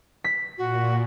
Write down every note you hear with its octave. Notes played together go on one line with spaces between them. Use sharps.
B6
A#2 F#4